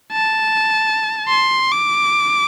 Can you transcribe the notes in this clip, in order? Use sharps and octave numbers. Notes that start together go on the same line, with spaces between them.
A5
C6
D6